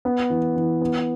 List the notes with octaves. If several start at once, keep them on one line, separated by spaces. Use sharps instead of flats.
B3
E3
E3
B3